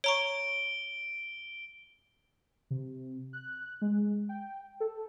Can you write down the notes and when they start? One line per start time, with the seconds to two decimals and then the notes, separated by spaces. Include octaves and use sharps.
0.04 C#5 A#5 C#6 D7 G7
2.70 C3
3.33 F#6
3.82 G#3
4.29 G5
4.80 A4